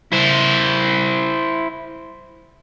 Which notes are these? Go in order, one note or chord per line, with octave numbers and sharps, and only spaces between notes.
E4 C5